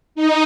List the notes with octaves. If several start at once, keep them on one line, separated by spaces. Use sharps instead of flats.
D#4